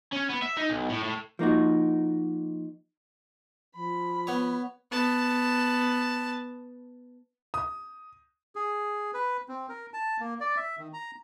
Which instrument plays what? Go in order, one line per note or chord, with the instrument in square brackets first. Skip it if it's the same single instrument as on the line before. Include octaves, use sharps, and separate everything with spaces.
[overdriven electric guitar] C#4
B3
E5
D#4
B1
A2
A2
[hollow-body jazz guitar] F3 A#3 D#4 F#4
[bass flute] F3 [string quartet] B5
[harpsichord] B3 C#5
[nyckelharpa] B3 A5
[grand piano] D#6
[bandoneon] G#4
B4
C4
A#4
A5
A#3
D5
E5
D#3
A#5